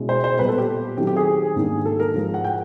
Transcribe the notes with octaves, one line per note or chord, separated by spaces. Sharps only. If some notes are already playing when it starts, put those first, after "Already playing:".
Already playing: B2 G#3 C#4 E4
C5
C5
A#2 G3 B3 B4
A4
G4
D#3 F#3 A3 C4 G4
G4
G#4
G#2 D#3 G3 A#3 D4
A4
A#4
G#2 F3 G#3
F#5
G5